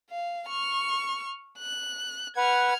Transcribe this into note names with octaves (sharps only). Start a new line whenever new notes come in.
F5
C#6 F6
F#6
B4 F#5 F6 G#6